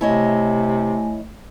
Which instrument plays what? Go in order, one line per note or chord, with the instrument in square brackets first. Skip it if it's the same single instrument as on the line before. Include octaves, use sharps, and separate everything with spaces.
[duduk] C3 [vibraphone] A3 G#5 [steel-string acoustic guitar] E4 C#5 D#5